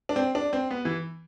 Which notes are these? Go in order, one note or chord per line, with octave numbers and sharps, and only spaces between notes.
D4
C4
D4
C4
B3
E3